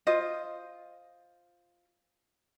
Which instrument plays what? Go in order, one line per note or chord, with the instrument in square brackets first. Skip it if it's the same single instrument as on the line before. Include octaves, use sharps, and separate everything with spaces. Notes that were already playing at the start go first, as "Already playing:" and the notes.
[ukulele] F4 C5 D#5